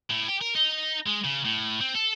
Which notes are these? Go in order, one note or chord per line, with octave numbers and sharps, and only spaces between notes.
A2
G4
A#4
D#4
G#3
C#3
A2
C4
A4